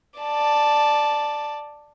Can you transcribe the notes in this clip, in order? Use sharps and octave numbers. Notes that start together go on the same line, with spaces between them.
D5 A5